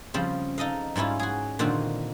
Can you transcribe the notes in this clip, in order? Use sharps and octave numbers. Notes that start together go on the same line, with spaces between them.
C#3 F3 G3 C4
D#4 A4 D#5 F5
G#2 G3 C#4 E4 F4
F#4 G#4
A#2 D3 D#3 C4 F#4